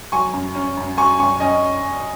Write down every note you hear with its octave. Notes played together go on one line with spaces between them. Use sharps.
F#3 G#5 C#6
F#2
C#4
F#2
F#3 G#5 C#6
F#2 G#5 C#6
C#4 D#5 G#5